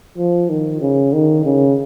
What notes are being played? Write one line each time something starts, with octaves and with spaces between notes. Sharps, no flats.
F3
D#3
C#3
D#3
C#3